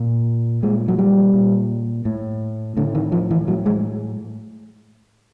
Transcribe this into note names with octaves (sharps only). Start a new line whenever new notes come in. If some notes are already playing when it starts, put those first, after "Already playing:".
Already playing: A#2
A#2 G#3
F#3
G3
A#2
A2
A2 D3
D#3
F3
E3
A2 F#3
G#3